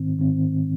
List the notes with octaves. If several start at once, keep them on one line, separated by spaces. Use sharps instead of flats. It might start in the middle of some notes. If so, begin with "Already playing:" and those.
Already playing: G#2 D#3 C4
G#2 D#3 C4